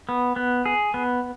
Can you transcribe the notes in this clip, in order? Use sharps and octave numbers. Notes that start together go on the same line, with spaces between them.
B3
B3
G#4
B3